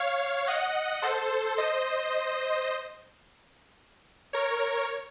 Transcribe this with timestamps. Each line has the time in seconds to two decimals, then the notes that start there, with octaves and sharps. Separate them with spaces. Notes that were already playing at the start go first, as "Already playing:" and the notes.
Already playing: C#5 F5
0.47 D#5 F#5
1.02 A4 C5
1.58 C5 D#5
4.33 A#4 C#5